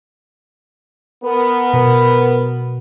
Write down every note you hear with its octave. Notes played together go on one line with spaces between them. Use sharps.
B3 A#4
B2 B4